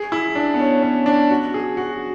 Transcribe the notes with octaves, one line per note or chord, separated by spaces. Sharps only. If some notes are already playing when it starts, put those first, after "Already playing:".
Already playing: G#4
E4
D4
B3
C#4
C#4
D4
F#4
G#4
F#4